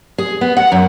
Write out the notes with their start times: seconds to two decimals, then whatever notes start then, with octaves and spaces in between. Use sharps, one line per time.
0.18 G#4
0.41 B3
0.57 F#5
0.72 F#2